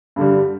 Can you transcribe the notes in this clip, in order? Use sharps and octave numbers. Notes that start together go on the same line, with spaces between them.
G2 D3 G3